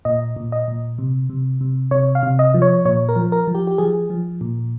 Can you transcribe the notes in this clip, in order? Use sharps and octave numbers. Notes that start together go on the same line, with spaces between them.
A#2 D#5
A#2
D#5
A#2
C3
C3
C3
C3 C#5
F5
C3
D#5
F3
C#5
A#2 C#5
A#4
F3
A#4
F3
G4
G4
F3 G#4
F3
A#2